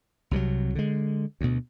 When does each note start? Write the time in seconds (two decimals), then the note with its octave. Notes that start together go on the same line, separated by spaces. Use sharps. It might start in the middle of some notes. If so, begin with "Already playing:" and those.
0.31 C2 C3 F3 F#3
0.75 D3 G#3
1.41 D2 B2